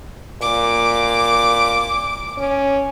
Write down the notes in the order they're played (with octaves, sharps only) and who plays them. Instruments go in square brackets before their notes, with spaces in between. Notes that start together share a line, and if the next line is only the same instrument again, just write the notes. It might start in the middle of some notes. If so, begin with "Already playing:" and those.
[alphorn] A#2 [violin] D6
[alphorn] C#4